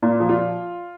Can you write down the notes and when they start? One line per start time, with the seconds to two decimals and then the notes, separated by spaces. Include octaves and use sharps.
0.03 A#2
0.20 F3
0.29 F4